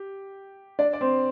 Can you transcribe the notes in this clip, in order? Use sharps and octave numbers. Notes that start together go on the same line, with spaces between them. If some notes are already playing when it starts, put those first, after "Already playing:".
Already playing: G4
D4 D5
D5
C4 C5